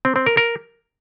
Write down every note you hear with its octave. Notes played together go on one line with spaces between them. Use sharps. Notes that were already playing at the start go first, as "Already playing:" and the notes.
C4
C4
A#4
A#4